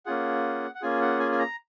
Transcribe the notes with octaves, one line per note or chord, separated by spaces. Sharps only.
A#3 C#4 F4 G#4 F#5
F#5
A#3 C#4 F4 G#4 G#5
F#5
G#5
G#5
A#5